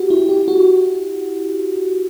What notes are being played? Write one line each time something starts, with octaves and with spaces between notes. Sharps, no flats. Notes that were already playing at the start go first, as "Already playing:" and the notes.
Already playing: F#4 G4
E4
G4
F#4